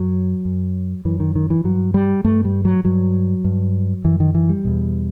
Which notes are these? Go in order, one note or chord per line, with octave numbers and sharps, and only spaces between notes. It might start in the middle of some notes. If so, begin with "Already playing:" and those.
Already playing: F#2 F#3
F#2
F#2 E3
D#3
D#3
E3
G2 F#3
G3
G2 A3
G3
F#3
G2 F#3
G2
F#2 E3
D#3
E3
G3
E2 B2